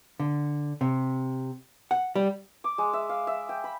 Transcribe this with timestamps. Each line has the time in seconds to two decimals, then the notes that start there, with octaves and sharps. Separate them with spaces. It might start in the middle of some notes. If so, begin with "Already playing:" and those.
0.20 D3
0.81 C3
1.91 F#5
2.16 G3
2.64 D6
2.78 G#3
2.93 E5
3.09 F5
3.27 E5
3.49 G5
3.64 B5